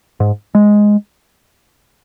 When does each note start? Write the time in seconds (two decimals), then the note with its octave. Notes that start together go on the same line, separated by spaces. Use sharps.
0.20 G#2
0.55 G#3